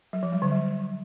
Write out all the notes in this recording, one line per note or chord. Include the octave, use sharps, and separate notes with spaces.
F#3
F3
G3
D3
F#3